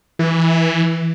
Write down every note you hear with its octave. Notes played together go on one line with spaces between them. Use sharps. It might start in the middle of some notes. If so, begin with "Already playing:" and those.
E3